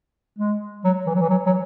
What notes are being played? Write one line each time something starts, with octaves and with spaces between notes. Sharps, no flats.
G#3
F#3
E3
F#3
E3
F#3
F#3